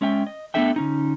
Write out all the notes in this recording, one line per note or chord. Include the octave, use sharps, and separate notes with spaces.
G#3 C#4 E5 F#5 G5
D#5
A3 B3 D4 A4 E5 G5
D3 C#4 D#4